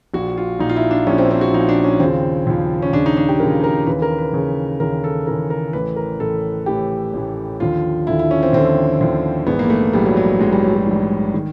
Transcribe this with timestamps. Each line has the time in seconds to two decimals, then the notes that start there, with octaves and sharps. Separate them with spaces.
0.14 A#1 A#2 F3 F#4
0.37 F4
0.60 A#1 A#2 F3 D#4
0.69 F4
0.76 E4
0.91 D4
1.07 A#1 A#2 F3 C#4
1.18 C4
1.31 C4
1.41 F#4
1.53 A#1 A#2 F3 D#4
1.69 D4
1.84 C#4
2.00 D#2 C#3 F3 C4
2.47 D#2 C#3 F3
2.82 C#4
2.93 D#2 C#3 F3 D4
3.06 D#4
3.17 D4
3.29 G4
3.40 D#2 C#3 F3 A#4
3.64 A#4
3.87 D#2 C#3 E3 B4
4.02 A#4
4.18 B4
4.33 D#2 C#3 E3
4.80 D#2 C#3 E3 A#4
5.04 A4
5.27 D#2 C#3 E3 A#4
5.50 A#4
5.73 A1 A2 E3 B4
5.96 A#4
6.20 A1 A2 E3 A4
6.66 A1 A2 E3 G4
7.14 A1 A2 E3
7.60 D#2 D3 F3 F4
8.07 D#2 D3 F3 E4
8.19 E4
8.31 C#4
8.43 C4
8.53 D#2 D3 F3 C4
9.01 D#2 D3 F3
9.47 A#1 G#2 E3 B3
9.59 A#3
9.70 A3
9.93 A#1 G#2 E3 G3
10.06 F#3
10.17 F#3
10.40 A#1 G#2 E3 G#3
10.53 G3
10.64 F#3
10.75 F#3
10.87 A#1 G#2 E3
11.34 D#3